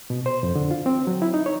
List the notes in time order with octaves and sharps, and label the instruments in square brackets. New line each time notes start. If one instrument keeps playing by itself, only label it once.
[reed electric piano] B2
C5
F2
D3
F4
C4
F#3
E4
D#4
C#5